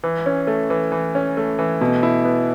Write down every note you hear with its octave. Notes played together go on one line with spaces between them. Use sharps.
E3
C#4
A3
E3
E3
C#4
A3
E3
B2
E4
B3